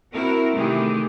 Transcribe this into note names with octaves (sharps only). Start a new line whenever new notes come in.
C4 E4 F#4 A#4
C3 D#3 E3 A3 G4 G#4